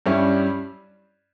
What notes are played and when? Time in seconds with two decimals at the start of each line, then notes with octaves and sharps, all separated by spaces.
0.06 G2 G3 C#4 E4